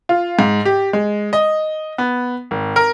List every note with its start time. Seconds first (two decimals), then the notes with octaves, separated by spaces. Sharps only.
0.09 F4
0.39 G#2
0.65 G4
0.93 G#3
1.33 D#5
1.98 B3
2.51 G#1
2.76 A#4